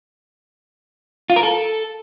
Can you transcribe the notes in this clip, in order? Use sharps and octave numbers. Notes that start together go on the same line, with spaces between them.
F4
A#4
A4